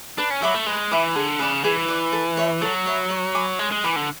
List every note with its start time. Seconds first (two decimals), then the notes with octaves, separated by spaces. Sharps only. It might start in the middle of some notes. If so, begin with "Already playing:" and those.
0.18 D4 B4
0.30 C#4
0.42 F#3 E5 B5 D6
0.54 A3
0.66 G#3 B4
0.91 E3 E5 B5 D6
1.16 D3 G#4
1.39 C#3 B4 D5
1.64 E3 G#4
1.88 B4 D5
2.13 A4
2.37 C#5 E5 B5
2.61 F#3 A4
2.86 C#5 E5 B5
3.10 C#5
3.35 G#5 B5 D6
3.59 G#3 C#5
3.72 G#3
3.83 E3 G#5 B5 D6
3.96 D3